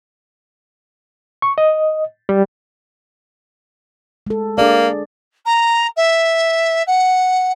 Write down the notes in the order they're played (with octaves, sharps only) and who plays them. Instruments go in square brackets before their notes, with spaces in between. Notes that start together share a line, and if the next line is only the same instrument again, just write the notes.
[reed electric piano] C#6
D#5
G3
[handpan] G#3 A4
[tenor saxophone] A#3 [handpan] D4 G#4 D5
[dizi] A#5
E5
F#5